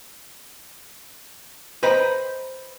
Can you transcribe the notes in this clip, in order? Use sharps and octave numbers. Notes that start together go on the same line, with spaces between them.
B4 C5 D#5 G5 A#5 B5